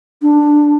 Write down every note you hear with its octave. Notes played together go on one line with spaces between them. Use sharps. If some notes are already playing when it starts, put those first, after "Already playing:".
D4